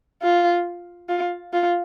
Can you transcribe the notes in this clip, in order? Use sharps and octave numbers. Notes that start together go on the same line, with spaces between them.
F4
F4
F4